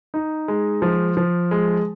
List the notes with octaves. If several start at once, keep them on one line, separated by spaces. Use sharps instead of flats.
D#4
G#3
F3
F3
G#3